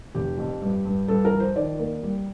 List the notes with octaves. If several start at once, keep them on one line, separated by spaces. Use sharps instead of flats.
F1 G4
F2
G2
G2
G2 A4
A#4
F3
C5
D#3 D5
A#3
G3